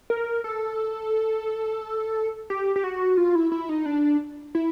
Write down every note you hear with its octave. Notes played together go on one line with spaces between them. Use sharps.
A#4
A4
G4
G4
F#4
F4
E4
E4
D#4
D4
E4